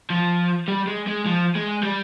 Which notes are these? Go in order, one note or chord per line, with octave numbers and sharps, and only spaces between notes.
F3
G3
G#3
G#3
F3
G#3
G3